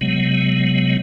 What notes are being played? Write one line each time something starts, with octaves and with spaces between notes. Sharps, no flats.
C3 F#3 G#3 B3